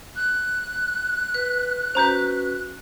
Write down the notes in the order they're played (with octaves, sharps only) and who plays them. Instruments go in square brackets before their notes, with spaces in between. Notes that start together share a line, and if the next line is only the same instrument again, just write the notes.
[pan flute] F#6
[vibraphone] B4
[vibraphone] C#4 F#4 B4 [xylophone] C5 A#5 G6